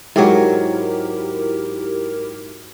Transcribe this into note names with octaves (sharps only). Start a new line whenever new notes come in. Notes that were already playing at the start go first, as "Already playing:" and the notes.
G#2 F#3 E4 G4 A#4